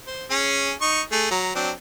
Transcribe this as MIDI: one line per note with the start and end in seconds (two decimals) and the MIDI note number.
0.07 0.25 72
0.31 0.73 61
0.31 0.73 68
0.82 1.01 63
0.82 1.01 85
1.12 1.30 57
1.12 1.30 68
1.31 1.52 54
1.31 1.52 82
1.55 1.71 54
1.55 1.71 60
1.55 1.71 62